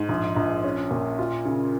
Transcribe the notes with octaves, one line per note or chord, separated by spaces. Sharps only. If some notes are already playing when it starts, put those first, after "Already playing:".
Already playing: G#2
A#1
A#1
C#4
A#2
F4
C#3